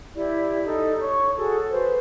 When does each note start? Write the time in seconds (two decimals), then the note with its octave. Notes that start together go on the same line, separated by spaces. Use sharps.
0.15 E4 G4 D5
0.65 D#4 A4
1.00 C#5 C#6
1.36 F#4 G#4 A4
1.70 B4 C5